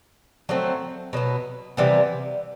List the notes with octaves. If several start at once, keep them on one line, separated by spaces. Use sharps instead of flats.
F#3 A3 C4
B2 F#3 B3
C3 E3 G3 B3